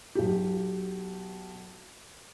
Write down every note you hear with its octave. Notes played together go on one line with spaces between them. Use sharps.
B1 G4